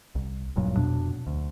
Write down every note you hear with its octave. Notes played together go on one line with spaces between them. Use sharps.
C2
D#1 G2 A#2 F#3
F2 B2 D4
D2